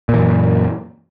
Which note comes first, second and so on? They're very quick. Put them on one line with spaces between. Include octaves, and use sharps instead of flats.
A#2 E3 F#2